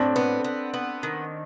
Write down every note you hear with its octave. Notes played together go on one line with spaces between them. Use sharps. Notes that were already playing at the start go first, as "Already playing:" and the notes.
Already playing: A2 C4 D4
B3
B3
B3
D#3